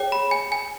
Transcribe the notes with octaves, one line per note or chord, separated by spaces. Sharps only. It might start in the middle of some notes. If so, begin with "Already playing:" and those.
Already playing: G#4 C#5 G5
B5
G#5
G#5